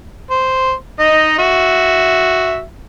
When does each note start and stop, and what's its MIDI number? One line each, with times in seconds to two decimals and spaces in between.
0.31 0.73 72
1.00 1.35 63
1.00 1.35 75
1.39 2.61 66
1.39 2.61 76